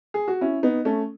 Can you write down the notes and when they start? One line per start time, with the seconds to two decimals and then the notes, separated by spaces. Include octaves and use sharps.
0.14 G#4
0.28 F#4
0.41 C#4 E4
0.63 B3 D#4
0.85 A3 C#4